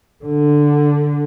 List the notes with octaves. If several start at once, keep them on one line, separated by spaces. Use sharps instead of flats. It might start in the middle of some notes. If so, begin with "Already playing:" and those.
D3